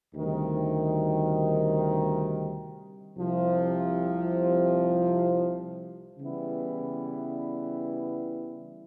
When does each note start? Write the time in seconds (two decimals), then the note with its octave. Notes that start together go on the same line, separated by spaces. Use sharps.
0.14 D2 C3 D#3 G3
3.17 C2 C3 F3
6.19 C#3 E3 G3 B3 E4